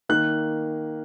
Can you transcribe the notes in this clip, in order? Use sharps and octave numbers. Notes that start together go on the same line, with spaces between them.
D#3 A#3 F#6